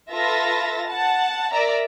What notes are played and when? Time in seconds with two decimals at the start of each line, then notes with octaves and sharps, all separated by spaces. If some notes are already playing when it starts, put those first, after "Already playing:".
0.11 F4 A4 B4 E5 A6 A#6
0.87 F#5 A5
1.52 A#4 D5 E5 A#5